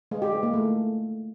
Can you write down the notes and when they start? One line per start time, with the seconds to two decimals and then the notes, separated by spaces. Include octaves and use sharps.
0.11 G#3
0.22 G4
0.32 G#3
0.43 A#3
0.53 A3